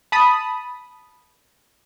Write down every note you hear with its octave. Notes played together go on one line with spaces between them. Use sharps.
A5 B5 D#6